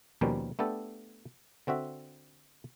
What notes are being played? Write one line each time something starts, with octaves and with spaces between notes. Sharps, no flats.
D#2 B2 F3 G3 A#3 C#4
A3 B3 D4 G4 A4
D3 C4 F#4 E5